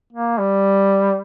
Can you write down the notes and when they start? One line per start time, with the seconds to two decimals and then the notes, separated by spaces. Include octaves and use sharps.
0.13 A#3
0.38 G3